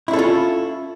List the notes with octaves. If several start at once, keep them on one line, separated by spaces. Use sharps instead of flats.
C#4 D4 E4 F4 A4